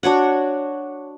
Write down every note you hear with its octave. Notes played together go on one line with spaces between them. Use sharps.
D4 F#4 C#5 F#5